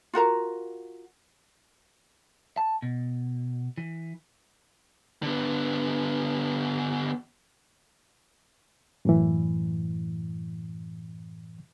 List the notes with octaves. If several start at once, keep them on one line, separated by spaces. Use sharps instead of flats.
F4 F#4 A#4 A#5
A5
B2
E3
D3 B3
F#2 A2 E3